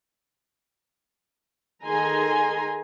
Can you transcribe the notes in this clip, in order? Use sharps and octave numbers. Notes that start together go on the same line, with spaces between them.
D#3 G#4 A4 G#5 A#5 C6